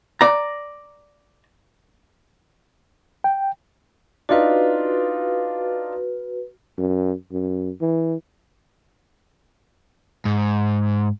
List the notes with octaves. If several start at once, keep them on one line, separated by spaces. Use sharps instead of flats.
D5 A#5
G5
D4 D#4 F4 F#4 B4
F#2
F#2
E3
G#2